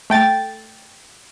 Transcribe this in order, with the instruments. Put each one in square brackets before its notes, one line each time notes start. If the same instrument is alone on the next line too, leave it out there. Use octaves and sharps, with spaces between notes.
[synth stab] A3 G5 A6